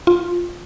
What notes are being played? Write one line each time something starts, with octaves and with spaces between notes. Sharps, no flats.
F4